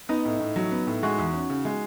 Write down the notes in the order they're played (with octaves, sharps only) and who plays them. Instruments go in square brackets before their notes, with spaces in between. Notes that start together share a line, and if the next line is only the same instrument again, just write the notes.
[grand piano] B3 [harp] D#4
[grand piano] A2
A2
F#3
B3
A2
[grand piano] G#3 [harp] F#4
[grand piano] E2
C#4
C#3
G#3